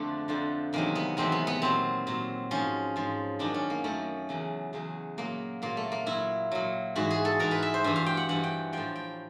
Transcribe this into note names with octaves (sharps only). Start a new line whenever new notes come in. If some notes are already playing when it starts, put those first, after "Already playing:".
Already playing: F2 D3 F3 A3 D4
F2 D3 F3
E2 C3 D#3 F#3 A#3
B3
E2 C3 D#3 F#3 C4
B3
B3
A#2 F#3 C4
A#2 F#3
G#2 F3 C#4
G#2 F3
F#2 D#3 F#3 D4
C#4
A#3
F#2 D#3 F#3 A3
E2 C#3 F#3
E2 C#3 F#3
A#2 F#3 A#3
A#2 F#3 A#3
A3
A#3
A#2 F#3 E4
A#2 F#3
G#2 E3 F#4
G#4
A4
G#2 E3 A#4
B4
E5
C5
G2 E3 E5
F5
G5
F#5
G2 E3 F#5
G5
A2 F3 G5
G5